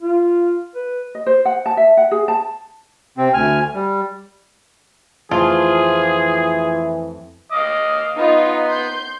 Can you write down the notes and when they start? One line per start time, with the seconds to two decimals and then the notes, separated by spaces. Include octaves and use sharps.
0.01 F4
0.75 B4
1.15 D#5
1.26 C5
1.45 F#5
1.66 A5
1.77 E5
1.97 F#5
2.11 G#4
2.28 A5
3.18 C3 C4
3.34 D2 G#5 F6
3.75 G3
5.31 F2 E3 A3 F4 G#4
7.52 D#5 F5 D6
8.17 B3 D#4 F4
8.64 C6 G6